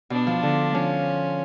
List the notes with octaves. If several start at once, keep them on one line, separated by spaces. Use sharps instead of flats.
B2 D4
F3
D3
F3 C#4